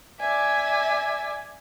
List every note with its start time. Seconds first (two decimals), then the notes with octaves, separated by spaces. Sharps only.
0.19 D5 E5 G#5